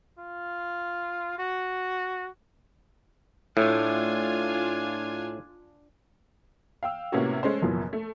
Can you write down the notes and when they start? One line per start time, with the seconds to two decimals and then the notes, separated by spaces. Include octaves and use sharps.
0.19 F4
1.39 F#4
3.57 A2 D4 F4 G#5
6.83 F5 G5 E6
7.12 A2 C3 A#3 B3 C#4 F#4
7.43 G#3 A3 C#4 C5
7.62 F#1 F#2 B2 E3 F3
7.93 A3